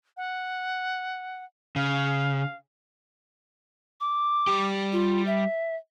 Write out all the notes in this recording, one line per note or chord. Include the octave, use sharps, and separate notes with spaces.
F#5
C#3 F5
D6
G3 G4
F4
E5